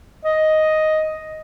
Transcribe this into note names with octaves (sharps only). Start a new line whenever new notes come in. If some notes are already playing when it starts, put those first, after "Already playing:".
D#5